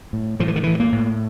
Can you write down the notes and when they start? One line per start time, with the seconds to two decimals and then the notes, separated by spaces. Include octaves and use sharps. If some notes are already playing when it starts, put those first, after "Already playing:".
0.13 A2
0.40 A2 F3
0.48 E3
0.56 D#3
0.63 A2 E3
0.80 A#3
0.92 A2